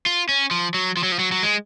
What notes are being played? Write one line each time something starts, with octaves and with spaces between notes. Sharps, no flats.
F4
C#4
F3
F#3
F3
F#3
F3
F#3
F#3
G#3